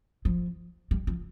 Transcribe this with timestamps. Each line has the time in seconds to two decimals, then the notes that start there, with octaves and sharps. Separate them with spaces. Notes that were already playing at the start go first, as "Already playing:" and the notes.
0.25 F3
0.91 G3
1.07 F3